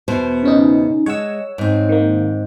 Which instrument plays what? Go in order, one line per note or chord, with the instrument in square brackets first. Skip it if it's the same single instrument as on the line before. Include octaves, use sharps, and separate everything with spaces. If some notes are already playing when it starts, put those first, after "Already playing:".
[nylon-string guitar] E2 B2 C5
[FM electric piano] C#3 C#4 D#4
[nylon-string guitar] G#3 [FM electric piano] C#5 F#5 E6
[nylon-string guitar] G#2 C4
[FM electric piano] D#3 A#3